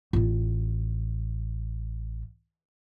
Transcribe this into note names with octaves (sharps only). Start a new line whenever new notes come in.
A1 F4